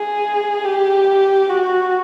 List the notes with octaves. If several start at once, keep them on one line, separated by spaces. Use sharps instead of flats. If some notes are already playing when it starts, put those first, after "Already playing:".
Already playing: G#4
G4
F#4